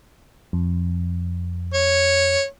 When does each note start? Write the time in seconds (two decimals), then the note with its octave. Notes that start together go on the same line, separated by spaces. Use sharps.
0.53 F2
1.74 C#5